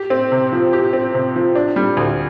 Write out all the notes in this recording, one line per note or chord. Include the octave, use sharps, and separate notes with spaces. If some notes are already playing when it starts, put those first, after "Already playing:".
Already playing: G4
C4
C3
F3
G4
C4
C3
F3
D4
G3
D2